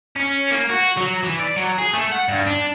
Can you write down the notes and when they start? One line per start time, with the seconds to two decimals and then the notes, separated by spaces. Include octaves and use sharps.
0.16 C#4
0.51 A#3
0.70 F#4
0.97 F#3
1.23 E3
1.39 D5
1.56 F#3
1.78 G#4
1.94 A3
2.12 F#5
2.29 G2
2.47 D4